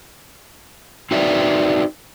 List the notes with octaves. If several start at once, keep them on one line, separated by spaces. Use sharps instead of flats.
C4 D#4 F#4 B4 D5 E5